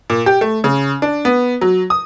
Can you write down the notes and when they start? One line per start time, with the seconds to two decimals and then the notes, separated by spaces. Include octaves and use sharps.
0.10 A#2
0.26 G4
0.41 A3
0.64 C#3
1.02 D4
1.25 B3
1.61 F#3
1.90 D#6